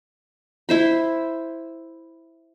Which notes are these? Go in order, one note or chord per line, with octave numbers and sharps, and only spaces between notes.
E4 C5 B5